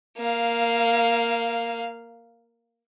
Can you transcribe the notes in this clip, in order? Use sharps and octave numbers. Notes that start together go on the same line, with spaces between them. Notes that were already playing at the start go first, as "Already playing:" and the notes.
A#3 F5